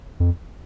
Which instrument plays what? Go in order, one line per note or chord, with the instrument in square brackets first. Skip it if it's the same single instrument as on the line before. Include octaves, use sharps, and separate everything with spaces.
[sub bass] F2